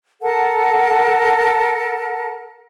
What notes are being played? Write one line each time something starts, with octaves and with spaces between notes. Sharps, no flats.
A4 A#4 F#5 A5